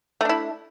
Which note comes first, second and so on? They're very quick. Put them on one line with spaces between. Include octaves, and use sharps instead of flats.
A3 D4 E4